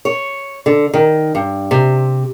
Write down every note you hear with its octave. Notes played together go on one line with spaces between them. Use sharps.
C#5
D3
D#3
G2
C3